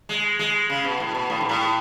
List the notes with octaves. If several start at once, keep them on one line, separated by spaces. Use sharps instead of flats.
G#3
G#3
C#3
B2
A2
B2
A2
G#2
A2